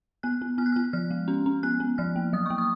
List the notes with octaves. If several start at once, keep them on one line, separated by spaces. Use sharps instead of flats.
B3 F#6
B3
B3 F6
F#6
B3 F6
F3 F6
G#3
C#4
C#4
B3 F#6
B3
F3 F6
A#3
F#3 D#6
A#3 C#6
D#6